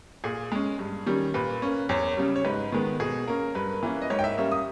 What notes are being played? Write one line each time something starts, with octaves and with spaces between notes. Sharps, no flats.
A#2 G#4
G#3 C#4
G2
D#3 G3 C#4
A#2 B4
A#3 C#4
E2 C#5
C#3 G3
C#5
G#2 B4
D#3 G#3 B3
B2 G#4
A#3 C#4 A#4
G2 B4
E3 A#3 C#4
D#5
G#2 C#5
G5
E5
G3 A#3 C#4 E5
D#6